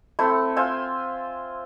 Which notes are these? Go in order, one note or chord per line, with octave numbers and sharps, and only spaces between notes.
A3 C4 E4
F4 C5 E5 G#5